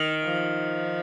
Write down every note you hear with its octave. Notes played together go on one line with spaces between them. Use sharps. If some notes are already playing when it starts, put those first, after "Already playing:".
Already playing: D#3
F3